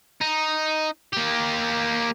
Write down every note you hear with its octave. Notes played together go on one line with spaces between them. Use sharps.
D#4
A#3 G4